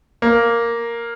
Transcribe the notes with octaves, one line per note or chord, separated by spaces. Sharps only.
A#3